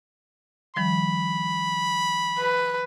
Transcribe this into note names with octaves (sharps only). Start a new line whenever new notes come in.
D#3 F3 G3 B5
B4